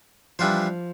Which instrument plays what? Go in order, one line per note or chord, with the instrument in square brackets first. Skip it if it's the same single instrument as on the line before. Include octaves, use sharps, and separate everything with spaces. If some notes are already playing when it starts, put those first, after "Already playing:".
[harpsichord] E3 G3 D4 F4 C5 [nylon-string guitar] F3